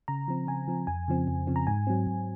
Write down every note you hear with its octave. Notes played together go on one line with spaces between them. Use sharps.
C#3 A#5
F3 C4
C#3 G#5
F3 C4
F2 G#5
C#3 F3 C4
F2
C#3 F3 C4
A#5
G#2 G#5
F#3 C4
G#2